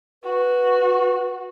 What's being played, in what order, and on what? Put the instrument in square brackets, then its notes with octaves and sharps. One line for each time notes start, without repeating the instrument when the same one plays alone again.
[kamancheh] F#4 [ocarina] B4